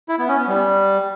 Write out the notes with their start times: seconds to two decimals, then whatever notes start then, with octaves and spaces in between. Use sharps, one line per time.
0.09 E4
0.19 B3
0.28 C#4
0.38 B3
0.48 G3